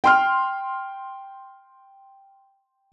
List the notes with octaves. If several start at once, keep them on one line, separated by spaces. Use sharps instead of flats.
G5 C6 F6